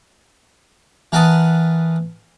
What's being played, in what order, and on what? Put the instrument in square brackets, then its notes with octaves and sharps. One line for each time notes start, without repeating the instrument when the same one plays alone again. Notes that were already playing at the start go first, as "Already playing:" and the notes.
[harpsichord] E3 A#4 B4 F#5 A5 D#6